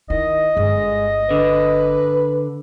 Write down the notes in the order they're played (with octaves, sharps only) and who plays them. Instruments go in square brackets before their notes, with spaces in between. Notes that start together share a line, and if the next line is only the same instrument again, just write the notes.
[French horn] D#3 [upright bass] E4 [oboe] D#5
[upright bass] G1 [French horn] G#3
[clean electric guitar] D3 [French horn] B4